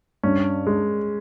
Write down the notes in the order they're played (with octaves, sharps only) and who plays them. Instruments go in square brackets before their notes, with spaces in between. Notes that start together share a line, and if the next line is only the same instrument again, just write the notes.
[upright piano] G2 [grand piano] C#4
[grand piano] G#3